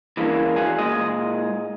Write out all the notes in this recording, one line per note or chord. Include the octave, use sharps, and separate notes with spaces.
E3 G#3 A#3 C#4 D4
E3 F#4 G#4 G#5
A#2 G#3 D#5